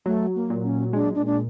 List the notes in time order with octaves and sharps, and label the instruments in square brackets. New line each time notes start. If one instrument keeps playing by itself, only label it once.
[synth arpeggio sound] F#3 [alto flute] A3
[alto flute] A#3
[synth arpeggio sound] A#2
[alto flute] C#4
[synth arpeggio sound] G#3 [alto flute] D4
[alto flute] D4
D4